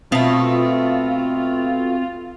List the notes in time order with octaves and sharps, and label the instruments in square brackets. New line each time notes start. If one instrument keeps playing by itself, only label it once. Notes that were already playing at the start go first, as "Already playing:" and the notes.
[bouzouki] B2 A3 [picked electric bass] C4 [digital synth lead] F4